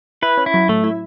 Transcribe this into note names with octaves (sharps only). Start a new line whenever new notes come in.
E4 B4
C#4
E4
F#3
A2 A3
E4